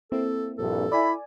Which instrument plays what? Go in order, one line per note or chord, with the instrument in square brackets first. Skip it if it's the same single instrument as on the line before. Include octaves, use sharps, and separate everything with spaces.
[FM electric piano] A#3 C4 E4 [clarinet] A4
[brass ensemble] A#1 G2 [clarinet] A4
[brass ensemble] E4 [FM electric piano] D5 G#5 [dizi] B5